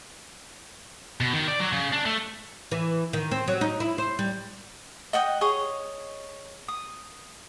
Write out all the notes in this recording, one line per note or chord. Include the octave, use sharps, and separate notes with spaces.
B2
D#3
D5
F#3
C#3
D4
A3
E3
D#3
C4
F#3
D#4
E4
C5
G3
D#5 F#5 G5 D#6
G#4 C#5 D#5
D#6